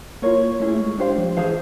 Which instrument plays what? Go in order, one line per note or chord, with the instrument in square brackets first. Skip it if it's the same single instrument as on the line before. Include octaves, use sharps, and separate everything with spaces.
[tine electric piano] A#3 [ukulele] F4 A#4 C#5
[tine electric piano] A3 [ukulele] C#4 E4 G#4
[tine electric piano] G#3
[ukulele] D4 G4 C5 F5
[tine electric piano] F3
[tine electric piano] E3 [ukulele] G#4 C5 F5 A5